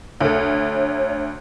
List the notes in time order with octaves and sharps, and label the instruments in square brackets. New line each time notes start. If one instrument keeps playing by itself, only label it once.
[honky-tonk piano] D2 A4 [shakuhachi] C#5